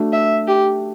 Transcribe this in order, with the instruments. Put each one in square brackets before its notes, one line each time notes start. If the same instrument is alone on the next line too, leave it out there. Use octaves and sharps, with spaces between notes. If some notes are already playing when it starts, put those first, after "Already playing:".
Already playing: [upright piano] A3 D4 F#4
[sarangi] E5
G4